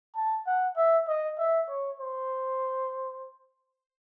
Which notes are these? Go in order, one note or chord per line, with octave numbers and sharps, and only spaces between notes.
A5
F#5
E5
D#5
E5
C#5
C5